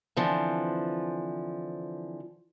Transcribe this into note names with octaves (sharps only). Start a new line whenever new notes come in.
D3 E3 F3 C4